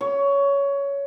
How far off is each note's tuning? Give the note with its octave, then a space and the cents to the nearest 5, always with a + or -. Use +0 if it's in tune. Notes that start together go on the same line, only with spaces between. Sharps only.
C#5 +15